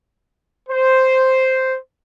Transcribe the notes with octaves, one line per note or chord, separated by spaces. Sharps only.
C5